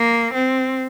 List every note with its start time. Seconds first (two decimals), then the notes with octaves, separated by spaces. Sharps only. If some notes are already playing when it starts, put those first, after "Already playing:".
Already playing: A#3
0.34 C4